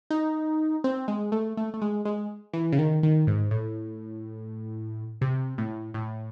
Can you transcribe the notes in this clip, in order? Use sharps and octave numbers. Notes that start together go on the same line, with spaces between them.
D#4
C4
G#3
A3
A3
A3
G#3
G#3
E3
C#3
D#3
D#3
G#2
A2
C3
A2
A2